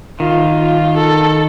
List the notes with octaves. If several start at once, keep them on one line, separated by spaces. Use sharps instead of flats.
D#3 F4
F4
A4